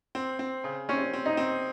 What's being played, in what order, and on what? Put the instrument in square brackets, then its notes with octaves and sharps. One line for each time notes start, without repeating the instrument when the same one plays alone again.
[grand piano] C4
C4
C#3
[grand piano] C4 [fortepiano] C#4
[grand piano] C4
[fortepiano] D#4
[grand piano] C4